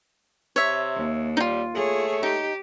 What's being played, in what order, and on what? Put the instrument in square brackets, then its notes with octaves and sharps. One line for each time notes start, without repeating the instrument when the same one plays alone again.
[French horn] C3 [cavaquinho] C#5 E5
[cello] D#2
[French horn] G3 [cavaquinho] D#4 F4
[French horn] A3 [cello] G#4 C#5
[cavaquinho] D#4 [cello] G4